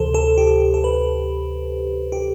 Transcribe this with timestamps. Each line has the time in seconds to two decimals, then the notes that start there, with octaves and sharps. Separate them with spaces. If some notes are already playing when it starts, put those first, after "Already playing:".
Already playing: D2 C3 E3 A4 C5
0.14 A4
0.38 G4
0.74 A4
0.84 B4
2.12 G4